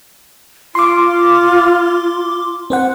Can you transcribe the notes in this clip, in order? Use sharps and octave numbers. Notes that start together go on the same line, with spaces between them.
F4 C6 D6
C4 C5 F#5